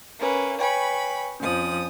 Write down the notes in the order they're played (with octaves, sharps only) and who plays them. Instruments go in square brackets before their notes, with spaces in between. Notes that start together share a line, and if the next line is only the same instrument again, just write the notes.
[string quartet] A#3 C#4 B4
[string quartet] B4 B5 C#6 [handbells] C#5 G5 G#5
[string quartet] F2 F3 D#6 [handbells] C#4